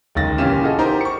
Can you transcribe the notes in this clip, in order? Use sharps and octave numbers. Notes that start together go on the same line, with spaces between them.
D1 C#2 D#3 A6 A#6
A#2 C#3 E3 C#4 G4 E7
F4 F#4 G#4 A4 D#5
D#4 G4 A#4 C5
C#6 C#7